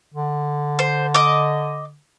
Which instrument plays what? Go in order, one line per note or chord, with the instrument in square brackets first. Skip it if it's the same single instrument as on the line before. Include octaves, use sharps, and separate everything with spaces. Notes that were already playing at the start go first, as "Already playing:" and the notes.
[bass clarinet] D3
[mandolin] C5
D#5 D6